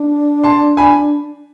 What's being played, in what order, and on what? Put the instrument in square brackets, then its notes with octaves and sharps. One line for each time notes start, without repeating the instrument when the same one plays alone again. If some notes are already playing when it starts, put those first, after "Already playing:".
Already playing: [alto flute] D4
[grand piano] A5 C6
G#5 B5